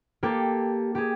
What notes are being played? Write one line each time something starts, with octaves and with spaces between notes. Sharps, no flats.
A#3 G4 A4
G4 G#4